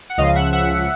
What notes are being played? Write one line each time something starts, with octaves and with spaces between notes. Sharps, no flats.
F#5
C#2 C#3 F3 D#5 F5
E5 F#5
E5 F#5